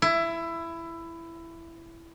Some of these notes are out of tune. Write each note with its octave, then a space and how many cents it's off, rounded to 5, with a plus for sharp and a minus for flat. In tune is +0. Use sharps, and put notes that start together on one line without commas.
E4 +15